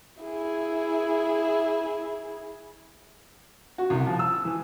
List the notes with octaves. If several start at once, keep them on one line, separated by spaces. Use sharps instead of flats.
E4 G#4
F#4
C2
F3
E6
E3